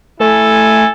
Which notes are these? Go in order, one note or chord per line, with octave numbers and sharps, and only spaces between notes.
A3 E4 A4 G#5